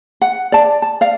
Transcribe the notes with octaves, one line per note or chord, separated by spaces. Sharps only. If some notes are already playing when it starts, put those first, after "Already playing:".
F#5
D5 A5
A5
D5 F5